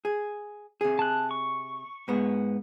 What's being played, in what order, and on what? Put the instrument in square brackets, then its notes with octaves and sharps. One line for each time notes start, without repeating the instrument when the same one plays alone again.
[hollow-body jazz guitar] G#4
C3 G#4
[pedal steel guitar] A5 F#6
C#6
[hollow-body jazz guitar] G#2 B3